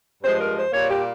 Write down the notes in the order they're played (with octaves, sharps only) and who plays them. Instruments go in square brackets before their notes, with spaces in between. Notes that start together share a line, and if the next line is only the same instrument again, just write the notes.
[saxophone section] G2 F3 G#3 C5
A#4
C5
A#2 G3 A#3 C#5
G4